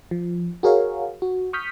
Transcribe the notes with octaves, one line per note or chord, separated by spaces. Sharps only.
F3
F#4 G#4 A#4 C#5 F5
F#4
C#6 D#6 F6 G6 B6